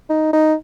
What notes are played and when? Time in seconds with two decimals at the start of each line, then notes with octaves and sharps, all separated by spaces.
0.10 D#4
0.33 D#4